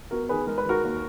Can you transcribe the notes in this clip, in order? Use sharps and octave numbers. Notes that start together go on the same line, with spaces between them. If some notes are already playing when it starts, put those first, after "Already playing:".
B3 F#4 A#4
D#3 G#4 B4
G#3 A#4
B4
D#3 F#4 A#4
D#2